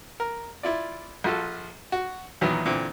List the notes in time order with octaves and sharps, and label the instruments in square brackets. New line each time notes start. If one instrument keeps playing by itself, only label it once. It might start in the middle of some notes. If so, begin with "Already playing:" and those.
[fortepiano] A#4
E4 F4 D5
A#1 F4 F#4 A4
F#4
E2 A#2 D#3 E3 F#3 B3
A#2 D3 E3 C4